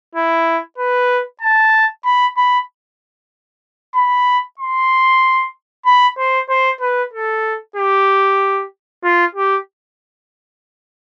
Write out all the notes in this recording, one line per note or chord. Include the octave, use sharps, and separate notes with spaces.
E4
B4
A5
B5
B5
B5
C6
B5
C5
C5
B4
A4
G4
F4
G4